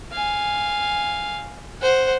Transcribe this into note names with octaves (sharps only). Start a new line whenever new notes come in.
F5 G#5
C5 F#5